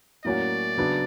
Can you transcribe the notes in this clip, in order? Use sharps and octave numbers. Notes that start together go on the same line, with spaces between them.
A2 F#3 A#3 C#4 F#4 D5
C#3 F#3 B3 D4